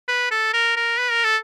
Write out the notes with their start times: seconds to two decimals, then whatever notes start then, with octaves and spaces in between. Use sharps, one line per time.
0.08 B4
0.31 A4
0.54 A#4
0.77 A#4
0.99 B4
1.11 A#4
1.24 A4